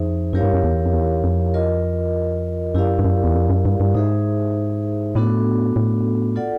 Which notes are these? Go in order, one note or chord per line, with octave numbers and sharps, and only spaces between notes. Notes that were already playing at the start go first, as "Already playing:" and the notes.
Already playing: F2 D#4 G#4 C5 E5
F#2 E4 G4 A#4 C#5 F5
G2
F#2
E2
F2
E2
F2
F4 A#4 D#5
F#2 E4 G4 A#4 D5 F5
G2
F#2
E2
F2
F#2
G2
G2
G#2 D#4 G#4 C5 E5
A2 B3 D4 F#4 A4
A2
F4 A4 D5 F#5